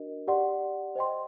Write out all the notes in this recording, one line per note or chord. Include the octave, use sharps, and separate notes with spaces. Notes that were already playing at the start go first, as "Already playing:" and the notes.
Already playing: D4 F#4 A#4 D#5
G4 D5 F#5 C6
C5 D#5 G5 C6